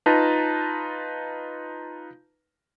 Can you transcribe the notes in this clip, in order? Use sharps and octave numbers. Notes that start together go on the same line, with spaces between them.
D#4 F4 B4 A5 A#5